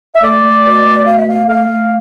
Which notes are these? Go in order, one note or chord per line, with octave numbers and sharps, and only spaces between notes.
E5
A3 D5
A3
B2
A3
B2 F5
E5
A3 F5
A3 F5
A3